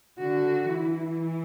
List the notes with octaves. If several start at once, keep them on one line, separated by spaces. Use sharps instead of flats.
D3 F#4
E3 E4